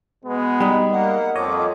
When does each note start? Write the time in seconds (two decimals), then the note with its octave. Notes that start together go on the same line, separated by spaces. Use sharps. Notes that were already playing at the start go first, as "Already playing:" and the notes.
0.24 B2 G#3 B3
0.60 G3 D#4 B5
0.92 A#3 F#5
1.36 F2 C#5 D#5 D6